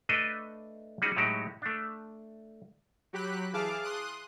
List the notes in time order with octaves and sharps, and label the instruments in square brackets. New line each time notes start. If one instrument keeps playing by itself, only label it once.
[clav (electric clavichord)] A3 D4 A4 B4 D#5
G3 C#4 D#4 F#4 G#4
A2 F#3 G#3 D#4 F#4 G4
A3 D4
[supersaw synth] F#3 G4 B5 F#6
E3 G#4 F5 A5 D6 F6
C6 D#6 F#6